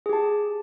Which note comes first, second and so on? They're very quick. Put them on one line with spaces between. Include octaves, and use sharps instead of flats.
G#4 G4 A5